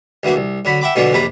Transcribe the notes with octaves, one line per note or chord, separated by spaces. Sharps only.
D2 E3 F#3 A#3
C2
D3 F#3 B5
E5 F#5 G5 B5 D6
B2 D3 E3 F#3 D4 F4
A#1 F2 C3 B4 A#5 B5